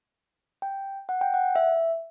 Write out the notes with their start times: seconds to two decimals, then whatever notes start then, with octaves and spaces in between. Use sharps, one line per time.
0.62 G5
1.09 F#5
1.21 G5
1.34 F#5
1.56 E5